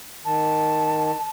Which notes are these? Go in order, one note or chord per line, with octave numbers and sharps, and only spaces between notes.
D#3 A5